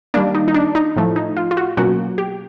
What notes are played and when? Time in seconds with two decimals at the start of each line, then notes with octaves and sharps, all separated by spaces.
0.14 D#3 G3 A#3 D4
0.35 D#4
0.48 D#4
0.54 D4
0.75 D#4
0.96 A2 F3 A3
1.16 D#4
1.37 F4
1.51 F4
1.57 F#4
1.77 B2 F#3 A#3 C#4 F#4
2.18 G4